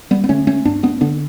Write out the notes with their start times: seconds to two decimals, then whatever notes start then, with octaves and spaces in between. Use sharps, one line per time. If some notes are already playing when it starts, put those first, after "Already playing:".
0.11 G3 B3
0.24 B3
0.29 D3 A3 C#4
0.47 A3 C#4
0.65 G2 B3 D4
0.83 B3 D4
1.01 D3 B3 D4